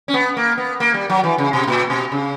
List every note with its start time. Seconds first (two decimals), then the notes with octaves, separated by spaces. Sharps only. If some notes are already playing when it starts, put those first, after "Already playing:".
0.08 C#4
0.14 B3
0.37 A#3
0.58 B3
0.80 A#3
0.94 G3
1.10 F#3
1.24 E3
1.38 C#3
1.53 B2
1.67 A#2
1.90 B2
2.12 C#3